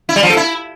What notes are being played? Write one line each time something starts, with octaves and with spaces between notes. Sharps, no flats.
E4
G3
F3
A4
E4